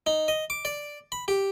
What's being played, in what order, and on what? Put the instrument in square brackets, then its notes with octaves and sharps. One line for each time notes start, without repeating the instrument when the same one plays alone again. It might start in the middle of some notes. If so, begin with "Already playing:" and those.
[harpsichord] D#4
D#5
D6
D5
B5
G4